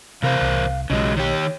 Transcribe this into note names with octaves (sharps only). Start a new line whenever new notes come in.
E2 C3 A#4 C5 F5
C2
B1 C#3 F#3 G#3 D#5
D#3 G4 C#5